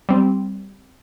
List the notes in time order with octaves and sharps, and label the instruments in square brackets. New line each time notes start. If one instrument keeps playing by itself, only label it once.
[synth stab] G3 C4